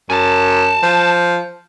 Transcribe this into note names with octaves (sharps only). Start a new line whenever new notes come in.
F#2 G#5 A5
F3